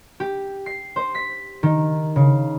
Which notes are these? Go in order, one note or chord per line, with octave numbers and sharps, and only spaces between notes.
G4
C7
C5
B6
D#3
C#3